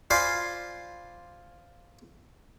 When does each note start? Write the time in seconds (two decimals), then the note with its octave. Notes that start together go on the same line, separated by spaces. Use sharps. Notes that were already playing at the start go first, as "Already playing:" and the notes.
0.10 F4 C5 D5 F5 G#5 B5